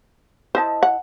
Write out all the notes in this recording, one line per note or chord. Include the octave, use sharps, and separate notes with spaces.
E4 C5 D#5 A5
F#5